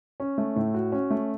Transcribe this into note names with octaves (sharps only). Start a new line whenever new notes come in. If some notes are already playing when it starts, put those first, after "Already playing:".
C#4
A3
A2
F#4
C#4
A3